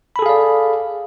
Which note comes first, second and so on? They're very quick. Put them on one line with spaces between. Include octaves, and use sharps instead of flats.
B5 A4 G#4 F5 D5